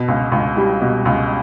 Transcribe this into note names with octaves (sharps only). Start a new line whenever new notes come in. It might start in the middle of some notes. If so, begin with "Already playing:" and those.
Already playing: B2
C#2
C#2
G3
B2
C#2